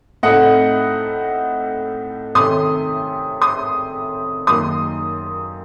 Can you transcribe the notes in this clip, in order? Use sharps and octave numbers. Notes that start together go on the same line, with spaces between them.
A2 A3 C4 D#4 D#5 F#5
C3 D#3 A3 C#4 C6 D#6
C6 D#6
F#2 D#3 A#3 D#4 C6 D#6